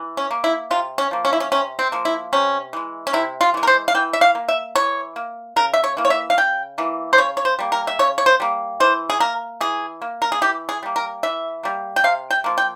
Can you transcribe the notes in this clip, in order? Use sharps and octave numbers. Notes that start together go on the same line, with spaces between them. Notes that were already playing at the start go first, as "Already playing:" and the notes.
Already playing: E3
C#4
A#3
E4
C3 F4
C#4
F3 A#3
C#4
E4
C#4
C3 C#4
C4
F3 A#3
E4
C3 C#4
E3 G#3
C#4
C3 E4
F4
E3 G#3
A#4
C5
F5
E3 G5
E5
F5
A#3
E5
E3 C#5
A#3
C#3 A#4
E5
C#5
E3 A#3
C#5
E5
F5
C#3 G5
E3 A#3
C5
C#3 C#5
C#5
C5
G3 A#3
A#4
E5
C#3 C#5
C#5
C5
G3 A#3
E3 C5
G#4
A#3 A#4
E3 G#4
A#3
A#4
G#4
E3 G4
G#4
G3 A#3
A#4
E3 E5
G3 A#3
G5
C3 F5
G5
F3 A#3
G5